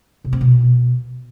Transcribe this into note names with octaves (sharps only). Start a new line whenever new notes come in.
C3
C4
B2